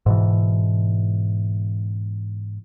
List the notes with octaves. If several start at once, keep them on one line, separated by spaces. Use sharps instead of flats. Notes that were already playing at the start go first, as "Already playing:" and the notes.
G#2 B2 E3